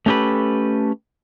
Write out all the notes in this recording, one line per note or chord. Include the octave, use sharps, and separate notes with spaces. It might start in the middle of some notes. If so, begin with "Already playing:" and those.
A3 C#4 G4 A4 B4